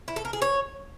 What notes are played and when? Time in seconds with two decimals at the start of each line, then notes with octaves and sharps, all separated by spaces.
0.08 E4
0.16 A4
0.25 A#4
0.33 G#4
0.42 C#5